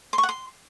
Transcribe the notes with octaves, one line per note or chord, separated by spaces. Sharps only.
C6
C#6
F#5
C6